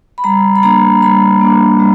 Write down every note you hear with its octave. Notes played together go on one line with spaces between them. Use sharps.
B5
G3 A#5
B5
A#3 D4 A#5
G3 B5
A#3 D4
G3